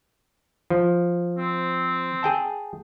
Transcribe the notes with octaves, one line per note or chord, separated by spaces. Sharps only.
F3
C4
G#4 G5 A5